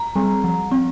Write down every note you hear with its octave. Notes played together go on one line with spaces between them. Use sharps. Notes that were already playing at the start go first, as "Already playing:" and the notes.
Already playing: A#5
G3 C4
F3
C4